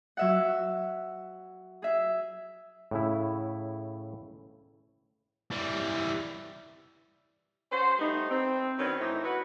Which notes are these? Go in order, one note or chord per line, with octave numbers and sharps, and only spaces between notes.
F#3 E5 F#5
G#4 E5
A2 C#3 E4
E3 G3
C#4 F#4 C5
G3 A3 B3 D#4
C4
D#3 F#3 B3 C#4 D4
A2 E3 C4 D#4
F#4 B4